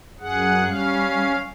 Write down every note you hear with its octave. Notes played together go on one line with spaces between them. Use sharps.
F#2 G#4 F#5
G3 C#4 F5